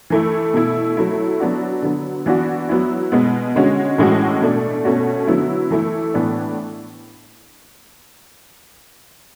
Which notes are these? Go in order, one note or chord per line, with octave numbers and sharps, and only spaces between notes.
E3 A3 E4
B2 A3 E4
F#3 A3 E4
F#3 B3 D4 F#4
D3 F#3 B3
E3 B3 D4 F#4
F#3 B3 E4
B2 G#3 B3
D3 G#3 C#4 F#4
A2 E3 G#3 C#4 F#4
B2 A3 D4
B2 A3 C#4 F#4
D3 F#3 B3 E4
E3 A3 E4
A2 E3 B3 D4